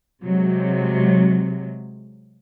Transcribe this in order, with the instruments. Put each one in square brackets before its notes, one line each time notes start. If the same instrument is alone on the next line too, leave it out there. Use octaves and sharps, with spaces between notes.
[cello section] C3 F#3 G#3